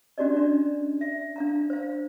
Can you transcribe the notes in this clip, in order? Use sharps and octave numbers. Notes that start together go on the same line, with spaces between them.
C#4 D4 F#4 G4 D5 D#5
D4
E5
D4 F5 A#5
C5 F5